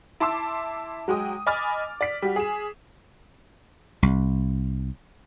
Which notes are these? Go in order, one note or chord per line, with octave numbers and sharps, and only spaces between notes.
E4 A5 C6 D6 E6
F#3 G#3 G5 D#6
D#5 G#5 B5 D6 F6 A6
D5 B6
G3 F#4
G#4 E7
C2